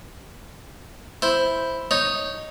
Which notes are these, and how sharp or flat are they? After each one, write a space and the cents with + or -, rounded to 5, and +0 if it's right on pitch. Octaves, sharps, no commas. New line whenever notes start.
E4 +0 C5 +0
D#4 +0 C#5 +0